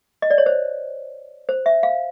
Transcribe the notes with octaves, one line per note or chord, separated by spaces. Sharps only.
D#5
D5
C#5
C5
C5
E5
F5